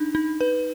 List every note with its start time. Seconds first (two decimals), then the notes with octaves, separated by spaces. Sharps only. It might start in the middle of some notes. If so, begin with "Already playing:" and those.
Already playing: D4 D#4
0.15 D#4
0.41 B4